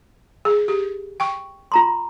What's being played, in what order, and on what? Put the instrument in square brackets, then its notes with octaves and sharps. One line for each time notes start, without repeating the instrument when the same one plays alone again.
[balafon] G#4
G4
G5 C#6
[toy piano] F4 A#5 C6